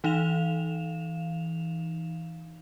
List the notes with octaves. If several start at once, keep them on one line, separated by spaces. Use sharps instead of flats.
E3 D#4 F5 E7 F7